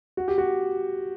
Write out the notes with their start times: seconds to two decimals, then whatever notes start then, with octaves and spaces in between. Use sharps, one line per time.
0.17 F#4
0.28 G4
0.38 F#4